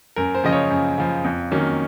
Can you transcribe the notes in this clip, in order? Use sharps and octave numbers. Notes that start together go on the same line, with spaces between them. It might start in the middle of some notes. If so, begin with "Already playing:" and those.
F#2 A#4
C5
C#3 F3 D#5
C#5
F#2
C#3 F3
F2
D#3 F#3 A#3 C#4